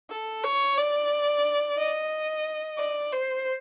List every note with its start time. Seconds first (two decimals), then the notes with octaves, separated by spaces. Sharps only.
0.10 A4
0.44 C#5
0.78 D5
1.78 D#5
2.78 D5
3.12 C5